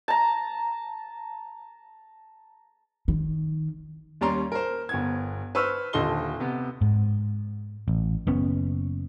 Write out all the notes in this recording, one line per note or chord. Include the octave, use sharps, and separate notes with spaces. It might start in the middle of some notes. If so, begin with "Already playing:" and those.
A5 A#5
D#3
D#2 G3 C#4 D5 A#5 C6
A#4 C5
G1 B3 G#6
B4 C5 C#6 E6 F6
D#1 D3 A4 D#5 C6 G7
C3 B3
G#2
A1
F#1 B3 C#4